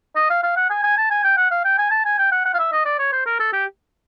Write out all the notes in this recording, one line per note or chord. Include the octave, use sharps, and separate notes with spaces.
D#5
F5
F5
F#5
G#5
G#5
A5
G#5
G5
F#5
F5
G5
G#5
A5
G#5
G5
F#5
F#5
F5
E5
D#5
D5
C#5
C5
A#4
A4
G4